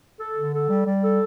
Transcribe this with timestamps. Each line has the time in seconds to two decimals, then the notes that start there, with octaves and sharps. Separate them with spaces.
0.19 A4
0.36 D3
0.52 A4
0.69 G3
0.86 G3
1.02 A4